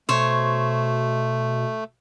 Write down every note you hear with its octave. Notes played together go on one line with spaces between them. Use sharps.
B2 A3 C5 C#5